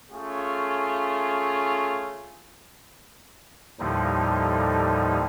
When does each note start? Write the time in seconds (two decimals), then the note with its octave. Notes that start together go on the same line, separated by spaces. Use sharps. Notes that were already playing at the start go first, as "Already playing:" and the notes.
0.11 A3 C#4 F4 G#4
3.80 D#2 A2 D3 F3 G3 D#4